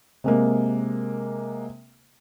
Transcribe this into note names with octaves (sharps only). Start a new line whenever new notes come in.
C3 G#3 A#3